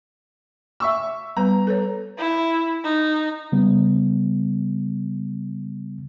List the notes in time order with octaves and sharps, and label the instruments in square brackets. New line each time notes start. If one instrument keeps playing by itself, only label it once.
[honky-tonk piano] E5 C#6 E6
[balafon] G3 B3 B4 [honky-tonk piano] A#5
[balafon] A4 B4 C#5
[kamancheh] E4
D#4
[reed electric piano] C#3 G3 B3